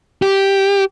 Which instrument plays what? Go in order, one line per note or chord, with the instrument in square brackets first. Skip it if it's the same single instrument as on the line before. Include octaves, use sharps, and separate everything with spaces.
[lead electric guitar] G4